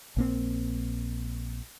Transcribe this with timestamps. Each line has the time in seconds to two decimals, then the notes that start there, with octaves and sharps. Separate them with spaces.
0.17 A#1 A#3 C4